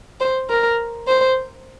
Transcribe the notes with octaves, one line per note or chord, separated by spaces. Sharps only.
C5
A#4
C5